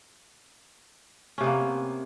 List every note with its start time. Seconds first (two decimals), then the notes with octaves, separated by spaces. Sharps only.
1.38 C#4
1.41 C3
1.43 B3
1.46 A#3